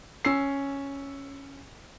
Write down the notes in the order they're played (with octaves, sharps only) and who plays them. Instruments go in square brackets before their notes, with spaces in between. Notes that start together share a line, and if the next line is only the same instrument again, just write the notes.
[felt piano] C#4 E6 C7